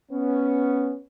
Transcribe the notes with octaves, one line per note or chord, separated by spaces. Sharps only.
B3 C#4